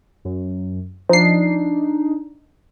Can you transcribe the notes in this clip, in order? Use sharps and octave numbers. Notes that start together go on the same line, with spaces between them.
F#2
F3 D4 D#4 C7